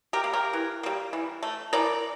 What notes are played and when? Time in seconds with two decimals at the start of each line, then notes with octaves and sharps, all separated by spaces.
0.13 G4 A#4
0.23 G3 A#3
0.33 G4 A#4
0.53 E3
0.83 G3 A#3
1.13 E3
1.43 A3
1.73 E3 A#4 D5